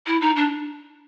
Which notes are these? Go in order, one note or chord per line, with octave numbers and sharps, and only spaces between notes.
E4
D#4
D4